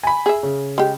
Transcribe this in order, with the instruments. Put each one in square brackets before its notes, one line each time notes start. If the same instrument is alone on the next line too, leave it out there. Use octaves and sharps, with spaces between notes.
[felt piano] G#5 B5
[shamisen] G#4 E5
[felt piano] C#3
[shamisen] G#3 G4